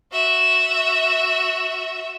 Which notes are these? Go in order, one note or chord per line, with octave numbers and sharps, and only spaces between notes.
F#4 E5